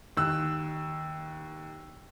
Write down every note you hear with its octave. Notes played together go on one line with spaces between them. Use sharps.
D#2 E6 F#6